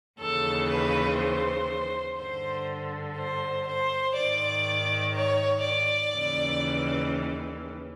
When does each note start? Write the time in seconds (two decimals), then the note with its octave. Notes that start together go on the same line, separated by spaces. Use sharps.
0.20 D#2 C#3 E3 A4
0.69 B4
1.19 C5
2.18 G2 D3 C5
3.17 C5
3.67 C5
4.16 G#2 D#3 D5
5.15 C#5
5.64 D5
6.14 D#2 C#3 E3